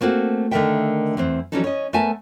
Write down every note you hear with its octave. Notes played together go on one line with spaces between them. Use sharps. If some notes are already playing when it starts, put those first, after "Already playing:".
A3 A#3 C4 F#4
D3 D#3 A3 A#4 E5 G5
E2 E3 C4
E3 F#3 G3 C#4 D#4 A4
C#4 D#5
A3 B3 A#4 E5 G#5 A5